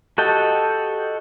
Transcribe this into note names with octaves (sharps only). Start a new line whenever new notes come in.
F#4 G4 A4 D#5 G5